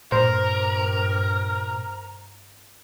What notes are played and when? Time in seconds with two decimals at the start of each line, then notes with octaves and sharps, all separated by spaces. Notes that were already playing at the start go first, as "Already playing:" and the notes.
0.12 G2 A#2 A#4 C5